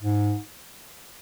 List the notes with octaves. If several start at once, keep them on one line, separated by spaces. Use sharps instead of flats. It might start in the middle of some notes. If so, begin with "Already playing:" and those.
G#2